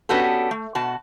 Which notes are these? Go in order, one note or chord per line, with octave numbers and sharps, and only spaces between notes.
B3 C#4 D4 F#4 G4 A4
A3
B2 F#4 A5